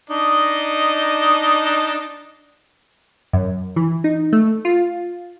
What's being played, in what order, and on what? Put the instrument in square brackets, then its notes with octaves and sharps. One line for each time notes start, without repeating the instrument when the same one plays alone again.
[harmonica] D4 D#4 D#5
[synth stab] F#2
E3
D#4
A3
F4